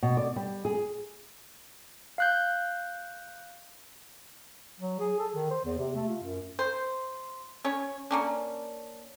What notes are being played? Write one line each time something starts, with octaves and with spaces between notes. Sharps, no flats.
B2
D5
G3
G#4
F5 F#6 G6
F#3
G#4
A4
D#3
C5
E2
C3
A3
F4
F#2
C5
C#4 C#5
A#3 C#4 D4